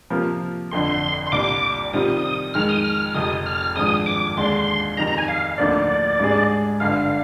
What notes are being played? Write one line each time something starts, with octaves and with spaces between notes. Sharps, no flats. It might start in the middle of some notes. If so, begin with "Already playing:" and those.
C3 F3 A#3 F4 A#4
G1 F2 D3 C6
C6
C2 A#2 G3 D6
C3 D#3 G3 C4 F4 D#6
F2 D#3 G#3 F6
D#6
F6
F1 F2 C3 D#6
F6
G#1 G2 F3 G#3 D#6
D6
D#2 D3 G#3 D4 C6
F2 D#3 G3 A#5
A#5
G#5
F5
D2 D3 F3 A#3 D#4 D5
G#2 G3 D4 G#4
G1 G2 D3 F5